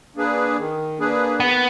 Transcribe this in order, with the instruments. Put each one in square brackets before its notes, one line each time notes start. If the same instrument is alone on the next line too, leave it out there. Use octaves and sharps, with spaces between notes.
[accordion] A#3 D4 G#4 B4
D#3
A#3 D4 G#4 B4
[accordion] D#3 [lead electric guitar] B3